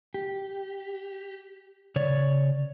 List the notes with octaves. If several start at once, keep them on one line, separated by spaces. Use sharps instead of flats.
G4
C#3 C#5 D5